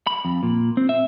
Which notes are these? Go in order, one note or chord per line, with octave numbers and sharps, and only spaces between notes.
B5
F2
A#2
C4
E5